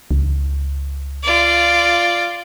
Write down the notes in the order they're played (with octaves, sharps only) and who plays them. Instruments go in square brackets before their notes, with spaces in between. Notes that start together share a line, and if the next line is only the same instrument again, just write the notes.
[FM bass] C#2
[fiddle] F4 D5